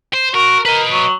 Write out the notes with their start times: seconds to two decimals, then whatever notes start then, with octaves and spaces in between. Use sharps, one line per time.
0.14 C5
0.34 F#4 A#4
0.65 A#4 B4 D#5
0.91 F#3